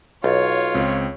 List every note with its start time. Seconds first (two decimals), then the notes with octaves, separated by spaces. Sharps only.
0.24 B1 F4 C#5
0.74 C#2 C4